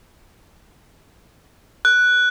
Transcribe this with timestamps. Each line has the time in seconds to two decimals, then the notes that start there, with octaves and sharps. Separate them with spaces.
1.85 F#6